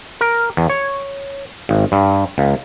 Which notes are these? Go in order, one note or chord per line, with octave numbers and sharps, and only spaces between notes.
A#4
E2
C#5
G#1
G2
C#2